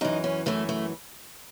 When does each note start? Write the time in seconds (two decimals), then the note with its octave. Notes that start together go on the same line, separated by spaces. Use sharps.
0.01 F#2 E3 D#4
0.24 C#4
0.46 F#2 E3 A3
0.69 A3